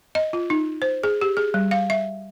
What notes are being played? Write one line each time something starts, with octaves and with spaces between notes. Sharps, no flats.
D#5
F4
D#4
C5
G#4
G4
G#4
G3
F5
E5